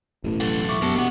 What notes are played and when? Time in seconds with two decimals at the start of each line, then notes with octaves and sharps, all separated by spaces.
0.24 E1 A1 A2 E3
0.41 F#3 A4
0.69 E5 C#6 D6
0.82 E1 F#2 B3 G4 A#4 A5
0.95 B2 A#3 F#5